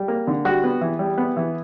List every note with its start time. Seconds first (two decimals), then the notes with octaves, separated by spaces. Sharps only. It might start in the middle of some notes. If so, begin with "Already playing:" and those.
Already playing: G3
0.08 A#3
0.27 D3
0.45 G3 F#4
0.64 B3
0.81 E3
0.99 G3
1.18 B3
1.37 E3